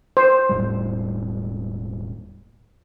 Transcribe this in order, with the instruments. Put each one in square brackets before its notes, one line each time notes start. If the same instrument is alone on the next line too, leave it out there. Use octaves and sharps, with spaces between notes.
[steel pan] C5
[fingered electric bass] E1 A2 G3